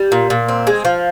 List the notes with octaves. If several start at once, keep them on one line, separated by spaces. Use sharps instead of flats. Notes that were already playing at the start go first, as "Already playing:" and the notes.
Already playing: G3
A#2
A#2
C4
G#3
F3